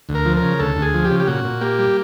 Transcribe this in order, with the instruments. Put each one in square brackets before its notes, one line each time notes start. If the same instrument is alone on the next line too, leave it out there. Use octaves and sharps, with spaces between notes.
[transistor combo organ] D2
A#4
F3
A#4
C#3
D2 A4
D2
G#4
F3
G4
C#3
G4
A#2 F#4
A#2
A#3 G4
G3